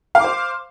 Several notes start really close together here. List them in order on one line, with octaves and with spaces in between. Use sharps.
F5 D6 C5